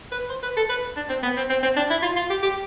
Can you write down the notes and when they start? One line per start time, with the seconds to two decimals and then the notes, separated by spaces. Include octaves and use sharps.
0.12 B4
0.29 C5
0.43 B4
0.57 A4
0.70 B4
0.96 D4
1.09 C4
1.23 B3
1.37 C4
1.50 C4
1.63 C4
1.76 D4
1.90 E4
2.02 F4
2.16 F4
2.30 G4
2.43 G4